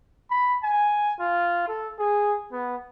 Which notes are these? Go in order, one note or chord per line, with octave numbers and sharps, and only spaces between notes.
B5
G#5
F4
A4
G#4
B3